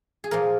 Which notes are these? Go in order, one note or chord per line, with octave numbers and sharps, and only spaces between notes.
G#4
A#2 F3 A#3 A#4